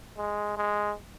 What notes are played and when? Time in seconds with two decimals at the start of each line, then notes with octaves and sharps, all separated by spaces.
0.18 G#3
0.57 G#3